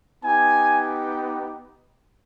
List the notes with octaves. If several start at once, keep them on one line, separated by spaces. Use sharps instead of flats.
B3 D#4 G4 G#5